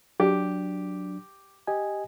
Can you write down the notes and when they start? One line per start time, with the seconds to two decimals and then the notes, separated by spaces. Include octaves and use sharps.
0.20 F#3 D4 G4
1.67 G4 D#5 G#5